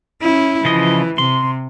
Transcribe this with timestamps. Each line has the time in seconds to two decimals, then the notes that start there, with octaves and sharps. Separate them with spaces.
0.22 C#4 E4
0.65 C#3 E3 F3 D#5
1.18 C3 C6